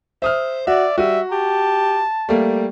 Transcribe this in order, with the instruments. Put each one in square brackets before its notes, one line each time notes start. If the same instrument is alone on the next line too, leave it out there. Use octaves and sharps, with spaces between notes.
[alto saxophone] C5 [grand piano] E5 D#6 F6
[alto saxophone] F#4 [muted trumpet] D5 [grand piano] E5
[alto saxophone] G3 [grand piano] F#4 [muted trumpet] E5
[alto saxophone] G4 [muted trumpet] A5
[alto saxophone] G3 [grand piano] A3 A#3